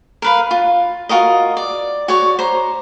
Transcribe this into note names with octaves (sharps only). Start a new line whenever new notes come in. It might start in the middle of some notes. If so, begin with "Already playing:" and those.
A#4 B4 F5
F4
F4 F#4 A#4 D#5
D5
F#4 C#5 D5
C5 A#5